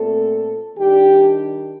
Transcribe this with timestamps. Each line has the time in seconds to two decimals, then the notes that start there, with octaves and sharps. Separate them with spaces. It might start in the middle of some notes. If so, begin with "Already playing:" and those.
Already playing: A#2 A3 C4 A4
0.78 D#3 G3 D4 G4